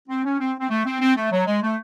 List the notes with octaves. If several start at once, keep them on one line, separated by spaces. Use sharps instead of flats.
C4
C#4
C4
C4
A3
C4
C4
A3
F#3
G#3
A3